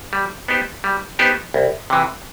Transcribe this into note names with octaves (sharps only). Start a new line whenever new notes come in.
G3
B3 D#4 G4 C5
G3
B3 D#4 G4 C5
C2
C3 E3